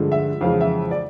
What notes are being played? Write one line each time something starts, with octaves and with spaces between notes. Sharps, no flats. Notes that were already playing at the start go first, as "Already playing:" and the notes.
Already playing: G2 D3 F3 G#3
E5
F2 C#3 E3 G#3 F5
E5
D5